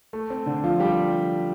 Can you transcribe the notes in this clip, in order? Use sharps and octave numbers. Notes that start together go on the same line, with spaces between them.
A3
C4
D3 D4
F3 F4
G3 G4